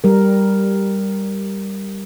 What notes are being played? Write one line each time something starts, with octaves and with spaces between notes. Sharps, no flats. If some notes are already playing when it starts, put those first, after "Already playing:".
G3 A#4